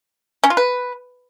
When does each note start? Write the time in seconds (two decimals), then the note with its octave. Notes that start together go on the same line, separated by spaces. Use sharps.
0.44 C#4
0.50 F4
0.57 B4